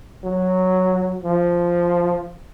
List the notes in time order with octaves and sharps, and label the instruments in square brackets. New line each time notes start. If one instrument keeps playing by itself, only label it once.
[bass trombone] F#3
F3